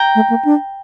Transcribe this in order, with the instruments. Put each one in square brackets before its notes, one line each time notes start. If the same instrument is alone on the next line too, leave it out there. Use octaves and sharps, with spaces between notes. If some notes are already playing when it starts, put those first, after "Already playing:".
Already playing: [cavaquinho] G5 A#5
[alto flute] A3
A#3
D4